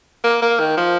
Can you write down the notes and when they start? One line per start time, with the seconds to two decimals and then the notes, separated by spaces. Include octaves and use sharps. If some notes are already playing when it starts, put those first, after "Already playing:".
0.24 A#3
0.42 A#3
0.60 D#3
0.77 F3